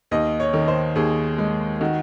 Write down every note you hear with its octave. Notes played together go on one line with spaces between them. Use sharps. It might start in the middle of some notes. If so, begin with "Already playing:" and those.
D#2 D#5
C#5
D#3
C5
D#2 G#4
G#3
D#3 F#4